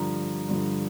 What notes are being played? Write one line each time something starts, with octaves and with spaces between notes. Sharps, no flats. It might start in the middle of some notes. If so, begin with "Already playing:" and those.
Already playing: G2 D3 F3 A#5
G2 D3 F3